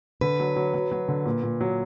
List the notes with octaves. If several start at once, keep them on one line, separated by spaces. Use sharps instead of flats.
D3 B4
F#3
F#3
F#3
F#3
D3
A#2
A#2
F#3